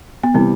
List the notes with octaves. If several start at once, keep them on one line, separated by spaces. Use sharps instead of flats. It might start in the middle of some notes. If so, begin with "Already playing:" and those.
B3
C3 E3 G3 C4